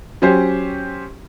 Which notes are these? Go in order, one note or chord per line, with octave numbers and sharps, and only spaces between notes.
F#3 C#4 G4 C5